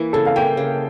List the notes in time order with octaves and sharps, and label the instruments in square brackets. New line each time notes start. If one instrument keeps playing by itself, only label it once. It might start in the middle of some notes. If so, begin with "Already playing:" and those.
Already playing: [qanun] E3 A#3 [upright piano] E4
[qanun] C#3 [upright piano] A4
[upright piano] F5
[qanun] A#3 [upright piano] G5
[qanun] C#3